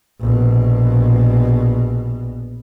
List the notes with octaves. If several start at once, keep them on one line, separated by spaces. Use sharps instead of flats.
A#1 B2